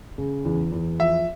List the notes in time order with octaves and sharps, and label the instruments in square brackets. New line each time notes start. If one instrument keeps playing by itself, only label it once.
[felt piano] C#3
E2
E2
[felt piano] F3 [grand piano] E5